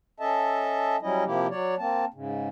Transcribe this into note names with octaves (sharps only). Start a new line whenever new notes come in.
C#4 A4 D#5 E5 A5
F#3 G3 C#4 E4 D#5
C3 F3 A#3 E4 G4
F#3 C#5 D5
A#3 C4 A5
G#2 C#3